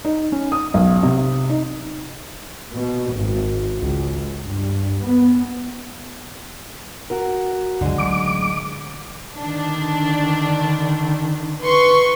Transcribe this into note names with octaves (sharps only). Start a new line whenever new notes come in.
D#4
C#4
D#6
B1
C3
D#4
B2
G#1
C#2
G2
B3
F#4 A#4
C#2 F#2 D3 G#3
A1 F#3 D4 D6
D3 D#3 D4
B4 C6 C#6